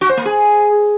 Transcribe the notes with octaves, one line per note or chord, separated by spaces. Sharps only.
F#4
C5
A#3
G#4